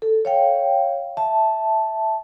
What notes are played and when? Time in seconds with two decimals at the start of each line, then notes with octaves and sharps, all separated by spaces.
0.02 A4
0.25 C#5 F5 G5
1.17 E5 A5